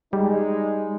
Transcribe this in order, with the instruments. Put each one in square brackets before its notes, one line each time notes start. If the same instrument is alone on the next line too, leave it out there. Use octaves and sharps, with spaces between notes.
[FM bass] G3 [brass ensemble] G#3 D#4